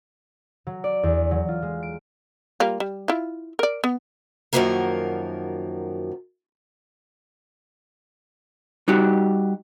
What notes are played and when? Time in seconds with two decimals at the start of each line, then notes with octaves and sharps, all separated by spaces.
0.67 F#3
0.84 D5
1.03 E2
1.31 F#3
1.48 F4
1.62 G#3
1.83 D7
2.60 G3 A#3 F4
2.80 G3
3.08 E4 F4
3.59 A#4 D5
3.84 B3
4.53 F#2 D#3 F3 F#3 A#3 A#4
8.88 G3 D#4 F#4 G4